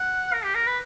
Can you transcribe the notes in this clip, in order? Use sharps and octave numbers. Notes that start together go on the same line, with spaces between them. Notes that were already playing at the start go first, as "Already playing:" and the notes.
Already playing: F#5
A#4
G4
A#4
B4